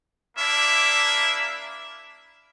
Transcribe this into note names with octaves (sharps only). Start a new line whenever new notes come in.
A#3 D4 E4 E5